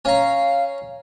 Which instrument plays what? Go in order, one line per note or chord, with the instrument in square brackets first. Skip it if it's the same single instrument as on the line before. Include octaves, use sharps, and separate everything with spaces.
[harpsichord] C#4 A#5 [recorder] F5